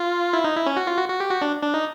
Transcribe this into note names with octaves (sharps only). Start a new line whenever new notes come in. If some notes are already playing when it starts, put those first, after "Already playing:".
Already playing: F4
E4
D#4
E4
C#4
F#4
F4
F#4
F#4
G4
F#4
D4
D4
D#4